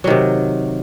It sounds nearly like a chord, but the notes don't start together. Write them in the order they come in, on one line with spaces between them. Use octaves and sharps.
F#3 D#3 C3